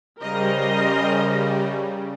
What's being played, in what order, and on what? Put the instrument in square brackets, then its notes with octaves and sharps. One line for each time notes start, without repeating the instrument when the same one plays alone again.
[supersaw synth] C#3 G3 [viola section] A#4 C5 D#5